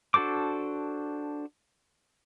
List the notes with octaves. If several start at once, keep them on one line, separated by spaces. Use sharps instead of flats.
D4 F#4 A4 C5 D6